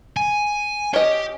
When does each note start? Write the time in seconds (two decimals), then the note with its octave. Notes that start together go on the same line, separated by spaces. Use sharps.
0.17 G#5
0.94 C#4 G4 D#5